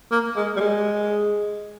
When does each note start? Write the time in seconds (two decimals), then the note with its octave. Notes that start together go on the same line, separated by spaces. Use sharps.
0.11 A#3
0.36 G#3
0.56 G3
0.60 G#3